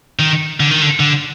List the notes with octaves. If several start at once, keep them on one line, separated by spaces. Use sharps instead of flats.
D#3
D3
D#3
D3
D3